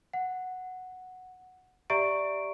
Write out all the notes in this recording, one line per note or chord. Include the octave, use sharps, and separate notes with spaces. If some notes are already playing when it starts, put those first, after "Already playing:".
F#5
G4 D5 E5 A#5 C#6 D7